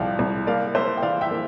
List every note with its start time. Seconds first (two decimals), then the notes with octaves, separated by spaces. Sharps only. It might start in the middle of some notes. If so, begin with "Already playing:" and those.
Already playing: C2 F3 D5 F5 G5
0.19 C2
0.47 A#3 D5 F5
0.75 A#3 C5 E5
0.97 G5
1.02 E3 D5 F5
1.21 E5 G5
1.31 A#3